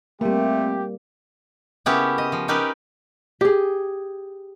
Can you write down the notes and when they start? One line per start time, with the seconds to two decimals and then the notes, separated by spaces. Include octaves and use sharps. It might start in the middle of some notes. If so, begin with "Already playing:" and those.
0.21 G3 A3 A#3 C4 G4 E5
1.86 C#3 A#3 B3 C#4 E4 G4
2.18 D#5
2.32 F3
2.48 C#4 D#4 G4 A#4 B4 D5
3.41 G4 G#4